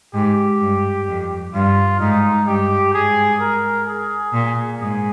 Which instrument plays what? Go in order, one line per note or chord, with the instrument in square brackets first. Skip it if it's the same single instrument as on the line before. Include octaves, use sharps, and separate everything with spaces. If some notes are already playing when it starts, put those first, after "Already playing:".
[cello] G#2 [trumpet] G4
[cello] G2
F2
[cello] G2 [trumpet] F4
[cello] G#2 [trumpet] D#4
[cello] G2 [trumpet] G4
[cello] G#2 [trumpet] G#4
[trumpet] A#4
G#4
[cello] A#2
[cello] G#2 [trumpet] G#4